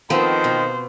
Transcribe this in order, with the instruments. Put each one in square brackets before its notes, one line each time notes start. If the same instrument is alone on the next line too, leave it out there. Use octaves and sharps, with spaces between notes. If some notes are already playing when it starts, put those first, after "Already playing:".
[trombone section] D#3 [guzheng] F3 B3 C4 [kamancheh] C5
[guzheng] B2